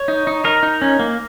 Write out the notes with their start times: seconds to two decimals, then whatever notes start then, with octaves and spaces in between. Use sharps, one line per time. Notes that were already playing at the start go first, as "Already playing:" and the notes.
Already playing: C#5
0.08 D#4
0.27 D#4
0.44 D#4 A#4
0.63 D#4
0.82 C#4
0.99 A#3